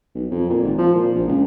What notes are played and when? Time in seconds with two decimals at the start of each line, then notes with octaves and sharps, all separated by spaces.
0.15 B1
0.31 F2
0.50 A#2
0.63 G#1
0.78 F3
0.95 A#2
1.15 A#1
1.28 C#2